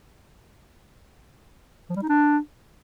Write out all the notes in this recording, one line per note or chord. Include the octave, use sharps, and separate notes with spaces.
F3
G3
D#4
D4